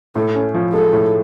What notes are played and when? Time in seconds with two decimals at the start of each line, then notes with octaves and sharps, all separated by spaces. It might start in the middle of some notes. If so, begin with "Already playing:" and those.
0.15 A2 A4
0.35 C#4
0.54 F3
0.73 G#3 A4
0.93 A2